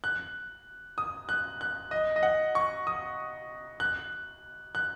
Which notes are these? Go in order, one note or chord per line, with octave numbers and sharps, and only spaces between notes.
F#6
D#6
F#6
F#6
D#5
D#5
F#5
C#6
D#6
F#6
F#6